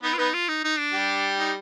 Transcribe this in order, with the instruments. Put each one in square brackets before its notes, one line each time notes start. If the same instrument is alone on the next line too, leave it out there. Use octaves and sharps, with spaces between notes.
[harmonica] B3 B4 [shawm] D#4
[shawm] F4
[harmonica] B3 B4 [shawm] D#4
[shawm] F4
D#4
D#4
D4
[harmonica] G3 G4
[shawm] D#4